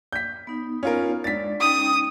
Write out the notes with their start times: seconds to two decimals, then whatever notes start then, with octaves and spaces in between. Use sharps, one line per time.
0.13 G6 B6
0.47 B3 D#4
0.83 C#4 F4 A#4
1.24 G#3 D4 D5 A6 B6
1.61 C#4 D#4 G5 D#6